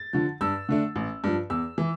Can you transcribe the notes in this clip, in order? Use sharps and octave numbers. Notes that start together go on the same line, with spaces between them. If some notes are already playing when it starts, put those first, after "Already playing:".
Already playing: A6
D3 F3
G2 E6
D3 A3 D4
A1
G2 F3
E2 E6
E3